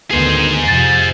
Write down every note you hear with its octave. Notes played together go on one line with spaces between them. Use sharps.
D2 D#3 B3 G#4 C5
F2 C3 F3 A6